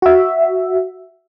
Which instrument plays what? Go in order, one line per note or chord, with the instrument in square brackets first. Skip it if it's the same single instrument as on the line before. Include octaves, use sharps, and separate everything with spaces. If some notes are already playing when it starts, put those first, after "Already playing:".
[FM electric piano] F#4 E5